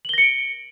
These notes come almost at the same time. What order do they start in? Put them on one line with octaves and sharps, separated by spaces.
F#7 G7 A#6 C#7 D7